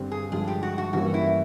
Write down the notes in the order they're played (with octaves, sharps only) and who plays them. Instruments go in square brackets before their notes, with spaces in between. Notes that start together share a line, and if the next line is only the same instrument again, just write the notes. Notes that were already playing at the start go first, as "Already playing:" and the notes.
Already playing: [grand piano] G2 D3 G3 C4
[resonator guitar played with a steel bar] G#4
[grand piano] G2 D3 F3 G#3 [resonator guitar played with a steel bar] G#4
[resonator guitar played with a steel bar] G4
F#4
F#4
[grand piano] G2 E3 G3 A#3 C#4 [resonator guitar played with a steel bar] F#4
[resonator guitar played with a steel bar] E4